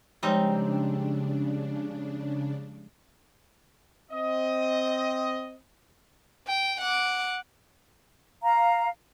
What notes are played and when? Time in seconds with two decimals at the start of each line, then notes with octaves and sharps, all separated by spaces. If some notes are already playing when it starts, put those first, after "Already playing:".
0.23 C#3 F3 G3 G#3 C4 D4 D#4 C#5
4.12 C4 D#5
6.48 G5
6.81 F#5 D6
8.42 F5 A#5